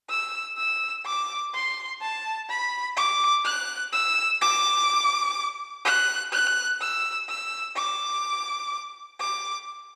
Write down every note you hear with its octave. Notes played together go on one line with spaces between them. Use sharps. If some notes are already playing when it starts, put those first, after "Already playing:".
E6
E6
D6
C6
A5
B5
D6
F#6
E6
D6
F#6
F#6
E6
E6
D6
D6